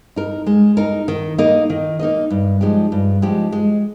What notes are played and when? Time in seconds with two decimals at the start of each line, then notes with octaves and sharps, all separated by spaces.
0.16 D#4 A#4
0.46 G#3
0.77 D#4 A#4
1.08 D#3
1.38 A#3 D#4 A#4 D#5
1.70 D#3
1.99 A#3 D#4 A#4 D#5
2.30 G2
2.61 F3 G#3 D#4 G4
2.92 G2
3.22 F3 G#3 D#4 G4
3.52 G#3